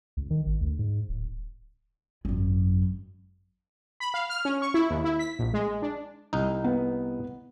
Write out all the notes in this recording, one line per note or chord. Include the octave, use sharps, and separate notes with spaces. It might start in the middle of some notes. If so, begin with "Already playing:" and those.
C#2
D#3
G#1
D2
G#2
D1
G#1 F#2
B5
F5
F6
C#4
C#6
E4
D#2
E4
B6
A#1
G#3
D4
C2 D#4
B3